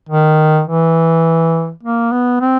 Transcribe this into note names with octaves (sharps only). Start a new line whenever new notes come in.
D#3
E3
A#3
B3
C4